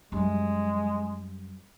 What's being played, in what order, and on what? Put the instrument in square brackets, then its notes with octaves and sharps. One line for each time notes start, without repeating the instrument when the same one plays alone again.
[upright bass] F#2 G3 [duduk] G#3